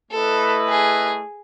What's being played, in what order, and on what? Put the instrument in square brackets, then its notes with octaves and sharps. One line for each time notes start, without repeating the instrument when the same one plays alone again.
[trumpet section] A3 E4 B4 D#5 [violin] A4
[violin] G#4